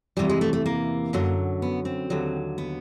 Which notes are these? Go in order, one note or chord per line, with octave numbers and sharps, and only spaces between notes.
E2 C3 E3 G3
G#3
A3
A3
A#3
F#2 D3 F#3
B3
C4
D#2 D3 F#3
B3